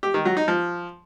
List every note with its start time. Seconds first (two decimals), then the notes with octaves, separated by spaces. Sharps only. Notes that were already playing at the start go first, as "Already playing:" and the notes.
0.03 G4
0.14 D#3
0.25 F#3
0.37 D#4
0.48 F3